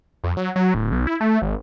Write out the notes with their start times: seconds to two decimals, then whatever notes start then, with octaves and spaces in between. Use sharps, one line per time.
0.24 F2
0.37 F#3
0.56 F#3
0.74 D1
0.92 B1
1.07 E4
1.21 A3
1.42 G#1